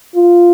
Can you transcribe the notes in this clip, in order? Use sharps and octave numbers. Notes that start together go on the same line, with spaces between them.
F4